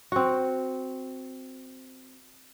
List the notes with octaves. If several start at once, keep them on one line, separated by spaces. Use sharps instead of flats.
C4 F#4